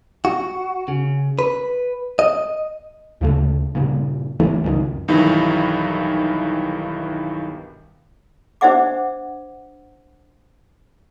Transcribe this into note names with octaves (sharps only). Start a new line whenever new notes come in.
F#4
C#3
B4
D#5
D2 C#3 A3
G2 A#2 C#3
F#1 E3 A3
C#2 F#2 D3 D#3
B1 G2 D#3 E3 E4
D4 C5 D5 E5 F#5 D6